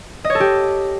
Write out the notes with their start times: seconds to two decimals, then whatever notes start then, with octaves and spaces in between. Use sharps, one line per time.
0.24 D#5
0.30 C#5
0.35 A4
0.40 G4